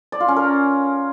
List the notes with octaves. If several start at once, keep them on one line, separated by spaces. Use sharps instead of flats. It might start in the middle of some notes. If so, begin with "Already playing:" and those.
D5
F4
C#4
A#4